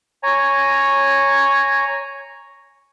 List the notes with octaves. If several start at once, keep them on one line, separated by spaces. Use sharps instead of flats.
C#5 G#5 A#5